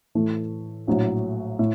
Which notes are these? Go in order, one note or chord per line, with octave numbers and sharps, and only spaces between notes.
A2 E3 A3
A#1 A2 F#3
A2